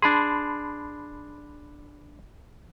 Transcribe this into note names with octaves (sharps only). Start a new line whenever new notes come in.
D4 G#4 A5 B5 C6